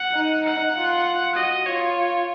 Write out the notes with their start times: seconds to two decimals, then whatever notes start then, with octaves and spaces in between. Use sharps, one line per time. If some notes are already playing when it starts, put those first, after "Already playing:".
Already playing: F#5
0.15 D#4
0.45 F#5
0.75 F4
1.35 F#4 D#5
1.66 F4 C#5